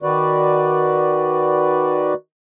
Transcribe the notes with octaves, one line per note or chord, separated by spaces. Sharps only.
D#3 F#4 B4 D5